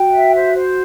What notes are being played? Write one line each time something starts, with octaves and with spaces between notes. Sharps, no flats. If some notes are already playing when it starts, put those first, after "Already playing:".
Already playing: F#4 G5
E5
C5
C5